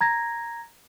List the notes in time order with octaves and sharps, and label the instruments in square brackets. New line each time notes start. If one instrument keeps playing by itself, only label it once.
[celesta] A#5 G#6 A#6